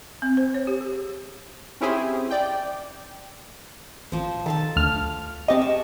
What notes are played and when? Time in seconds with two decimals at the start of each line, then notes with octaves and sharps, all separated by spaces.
0.22 C4
0.37 C5
0.54 C#5
0.67 G4
0.81 G#4
1.81 C4 C#4 E4 G4 G#4 C5
2.31 D5 G5
4.12 A1 F3 C5
4.46 D#3 A4 F5 A5
4.76 D2 F6
5.48 G#3 C4 G4 D#5 A5 C#6
5.62 C#6